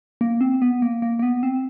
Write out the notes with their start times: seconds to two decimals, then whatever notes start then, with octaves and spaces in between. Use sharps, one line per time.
0.21 A#3
0.41 C4
0.62 B3
0.82 A#3
1.02 A#3
1.19 A#3
1.22 B3
1.43 C4